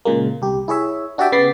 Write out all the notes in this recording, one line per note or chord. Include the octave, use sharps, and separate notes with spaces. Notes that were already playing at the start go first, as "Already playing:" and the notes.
A#2 C#3 G#3 A#3
C2 G4
E4 G#4 C#5 E5
D4 F#4 G4 D5 E5 G5
C#3 B3 D6 A6 B6 C7